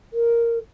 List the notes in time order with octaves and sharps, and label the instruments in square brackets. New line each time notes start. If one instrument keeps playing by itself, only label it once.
[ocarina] A#4